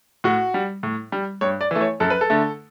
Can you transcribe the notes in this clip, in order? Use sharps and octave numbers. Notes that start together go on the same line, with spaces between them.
A2 F#4
G3
A2
G3
G2 C#5
D5
E3 A3
C#5
F#2 A4
B4
A4
D3 A3